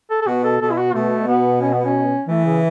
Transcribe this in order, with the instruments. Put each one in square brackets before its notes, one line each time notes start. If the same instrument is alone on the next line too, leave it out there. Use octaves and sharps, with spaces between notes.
[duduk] A4
A4
[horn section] B2 [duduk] F#4
[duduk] A4
[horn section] B2 [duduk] A4
[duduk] E4
F#4
[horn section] B2 [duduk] A3
[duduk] B3
C#4
B3
C#4
[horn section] E3 [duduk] A3
[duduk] C#3